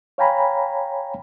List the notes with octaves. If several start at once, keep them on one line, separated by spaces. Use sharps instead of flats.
C#5 F5 G5 G#5 A#5 B5